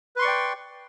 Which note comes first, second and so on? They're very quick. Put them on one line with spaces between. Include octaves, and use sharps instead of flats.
B4 C6 C#6 D5 G5